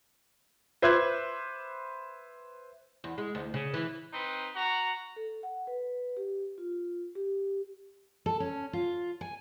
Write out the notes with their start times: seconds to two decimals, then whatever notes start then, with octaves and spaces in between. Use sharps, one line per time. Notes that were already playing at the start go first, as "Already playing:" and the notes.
0.82 B4 C5 E5 D6 F#6 G#6
3.04 E2
3.18 G#3
3.35 D2
3.54 C#3
3.74 E3
4.13 C4 D#4 B4
4.55 F#4 F#5 A#5
5.16 A4
5.43 F#5
5.67 B4
6.17 G4
6.58 F4
7.15 G4
8.26 A4
8.40 C#4
8.73 F4
9.21 G#5